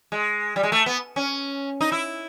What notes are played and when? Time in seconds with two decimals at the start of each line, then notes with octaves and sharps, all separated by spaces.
0.12 G#3
0.56 G3
0.63 G#3
0.72 A3
0.86 B3
1.16 C#4
1.81 D#4
1.92 E4